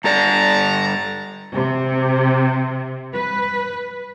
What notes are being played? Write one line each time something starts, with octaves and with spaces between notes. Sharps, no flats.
G2 A4 D5 A5 A#5
C3
B4